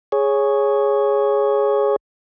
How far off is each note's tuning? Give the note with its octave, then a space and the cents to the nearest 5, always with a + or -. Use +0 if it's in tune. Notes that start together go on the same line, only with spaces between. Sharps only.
G#4 +0 C#5 +0